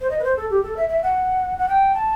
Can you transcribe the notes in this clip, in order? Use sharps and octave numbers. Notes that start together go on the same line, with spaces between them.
C5
D#5
B4
C5
A4
G4
A4
E5
E5
F#5
F#5
G5
A5